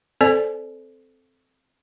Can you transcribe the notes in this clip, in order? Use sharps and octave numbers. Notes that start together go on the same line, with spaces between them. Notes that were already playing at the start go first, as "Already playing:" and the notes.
C4 A4 C5 D5 G#5